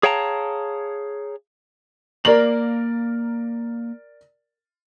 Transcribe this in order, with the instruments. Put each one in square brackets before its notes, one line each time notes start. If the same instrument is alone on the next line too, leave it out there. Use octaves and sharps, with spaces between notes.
[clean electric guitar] G#4 C#5 F5 G5 A5 A#5
[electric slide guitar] A#3 A#5 [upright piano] A#4 D5 F#7